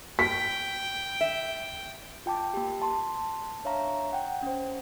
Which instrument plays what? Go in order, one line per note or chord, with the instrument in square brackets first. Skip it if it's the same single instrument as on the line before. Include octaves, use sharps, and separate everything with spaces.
[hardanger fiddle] G5 [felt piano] B6
[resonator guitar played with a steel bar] E5
[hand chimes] F4 G5 A5 D6
A#3 G4
A5 C6
D4 C#5 E5 F5 A#5
F#5 G5
C#4 C5